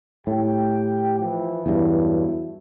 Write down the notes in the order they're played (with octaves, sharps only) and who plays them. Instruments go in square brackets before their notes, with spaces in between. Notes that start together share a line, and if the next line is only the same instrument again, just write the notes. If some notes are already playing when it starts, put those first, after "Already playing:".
[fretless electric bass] A2 [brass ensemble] G4 G5
[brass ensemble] E3 F3
[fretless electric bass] E2 G2 [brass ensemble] F#3 E4